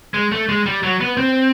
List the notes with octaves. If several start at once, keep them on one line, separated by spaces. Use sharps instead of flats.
G#3
A3
G#3
G3
F#3
B3
C4